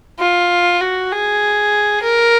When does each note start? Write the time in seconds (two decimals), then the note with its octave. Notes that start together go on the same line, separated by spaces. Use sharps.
0.20 F4
0.81 F#4
1.12 G#4
2.03 A#4